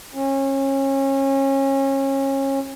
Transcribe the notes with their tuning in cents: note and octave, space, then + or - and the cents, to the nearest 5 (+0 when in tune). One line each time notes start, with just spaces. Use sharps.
C#4 -30